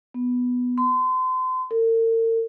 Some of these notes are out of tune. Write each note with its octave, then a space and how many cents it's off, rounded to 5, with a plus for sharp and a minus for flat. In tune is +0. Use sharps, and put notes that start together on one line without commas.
B3 +0
C6 -35
A#4 -45